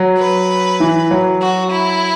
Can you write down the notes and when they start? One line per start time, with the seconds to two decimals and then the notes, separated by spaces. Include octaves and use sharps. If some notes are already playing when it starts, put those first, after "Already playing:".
Already playing: F#3
0.18 B4
0.80 E3
1.11 F#3
1.42 F#4
1.72 E4